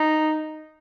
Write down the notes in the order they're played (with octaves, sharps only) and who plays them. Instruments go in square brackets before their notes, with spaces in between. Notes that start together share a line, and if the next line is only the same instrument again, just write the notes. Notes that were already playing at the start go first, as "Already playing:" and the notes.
Already playing: [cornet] D#4